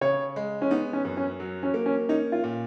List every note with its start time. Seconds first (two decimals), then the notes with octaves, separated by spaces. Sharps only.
0.01 C#3 C#5
0.36 G#3
0.62 C#4
0.71 B3 D#4
0.93 C#4
1.05 F#2
1.17 C#4
1.40 F#3
1.63 C#4
1.74 A#3
1.86 C#4
2.09 C#4 D#4
2.32 F4
2.44 A#2